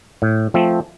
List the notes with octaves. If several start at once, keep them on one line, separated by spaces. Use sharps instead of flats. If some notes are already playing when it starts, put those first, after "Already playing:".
A2
F3 A3 C4